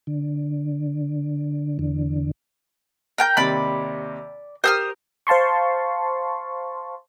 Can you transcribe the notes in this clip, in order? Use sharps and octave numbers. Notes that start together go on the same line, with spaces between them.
D3
E2 D3
A#4 G5 G6
D#2 C3 D5 B5
G4 A#4 C5 D#6 F6
C5 F5 A5 C6 C#6